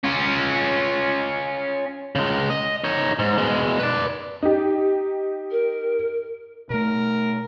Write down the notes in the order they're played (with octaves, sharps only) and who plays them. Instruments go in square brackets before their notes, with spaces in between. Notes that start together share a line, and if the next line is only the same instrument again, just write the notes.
[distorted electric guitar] C#4 F4
[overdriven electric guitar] C#3 G#3
D#5
D#4 C#5
G#2
B2 G#3
B4 D5
[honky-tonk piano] D#4 G4
[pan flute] A#4
[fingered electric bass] B2 A3 [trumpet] A#4